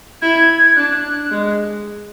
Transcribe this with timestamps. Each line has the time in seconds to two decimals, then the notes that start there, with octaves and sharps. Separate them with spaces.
0.22 E4 G#6
0.76 D4 F#6
1.31 G#3